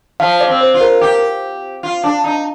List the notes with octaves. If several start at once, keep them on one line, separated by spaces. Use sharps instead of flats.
F3 F5
D5
C4
C5
F4
A#4
G4
F4
D4
D#4